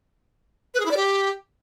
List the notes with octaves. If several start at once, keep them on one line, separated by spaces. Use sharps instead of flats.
B4
G#4
E4
D5
G4